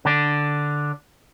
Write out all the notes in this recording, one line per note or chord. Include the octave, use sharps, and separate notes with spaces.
D3 D4